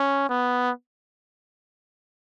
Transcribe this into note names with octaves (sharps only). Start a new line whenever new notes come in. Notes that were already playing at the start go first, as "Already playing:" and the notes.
Already playing: C#4
B3